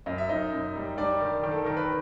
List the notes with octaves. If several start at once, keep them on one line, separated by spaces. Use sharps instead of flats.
F#2 D#5
E5
F#2 D#4 D#5
F#2
G3
G3 D4 D5
D#3
D#3
A4
D#3 A#4
B4